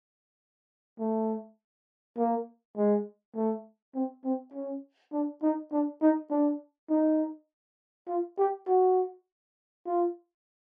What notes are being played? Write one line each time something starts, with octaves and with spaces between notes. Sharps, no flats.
A3
A#3
G#3
A3
C4
C4
C#4
D4
D#4
D4
D#4
D4
D#4
F4
G4
F#4
F4